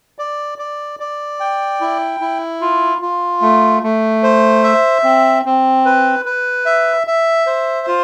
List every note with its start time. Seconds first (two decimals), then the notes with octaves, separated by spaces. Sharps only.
0.19 D5
0.58 D5
1.00 D5
1.40 G5
1.81 E4
2.20 E4
2.61 F4
3.01 F4
3.42 A3
3.83 A3
4.23 C5
4.64 E5
5.04 C4
5.45 C4
5.85 B4
6.26 B4
6.66 E5
7.07 E5
7.47 C5
7.87 F4